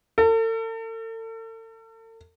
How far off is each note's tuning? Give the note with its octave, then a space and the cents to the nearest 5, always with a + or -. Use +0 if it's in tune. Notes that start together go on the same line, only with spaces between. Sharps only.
A4 +40